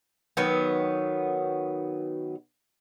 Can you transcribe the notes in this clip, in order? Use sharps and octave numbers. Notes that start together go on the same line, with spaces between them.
D#3 F#3 B3